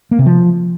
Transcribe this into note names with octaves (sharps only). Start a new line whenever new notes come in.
A#3
C3
F3